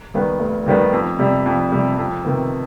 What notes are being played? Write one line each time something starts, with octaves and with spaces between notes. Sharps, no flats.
D#2 D#3 G3 B3
F1
D#2 D#3 G3 B3
F2
C3 G3
F2
C3 G3
F2
C3 D#3 B3